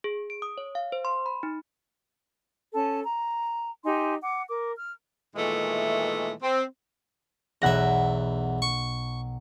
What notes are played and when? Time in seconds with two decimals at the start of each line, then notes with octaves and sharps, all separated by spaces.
0.04 G#4
0.30 D7
0.42 D#6
0.58 C#5
0.75 F5
0.92 C5
1.05 C6
1.26 B5
1.43 D#4
2.74 C#4 A4 A5
3.04 A#5
3.85 D#4 G4 G#5 C6
4.22 F#5 D6
4.49 A#4 D6
4.75 F6
5.35 A#2 D#3 E3 G#3 A3
6.42 C4
7.62 B1 E2 E5 F#5 A#6
8.62 C#6